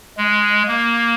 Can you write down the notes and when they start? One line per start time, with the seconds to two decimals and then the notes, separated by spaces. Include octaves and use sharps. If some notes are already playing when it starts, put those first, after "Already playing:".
0.17 G#3
0.68 A#3